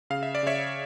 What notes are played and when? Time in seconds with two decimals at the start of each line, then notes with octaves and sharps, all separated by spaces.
0.10 C#3 F5
0.23 E5
0.35 D5
0.43 C#3 C#5 E5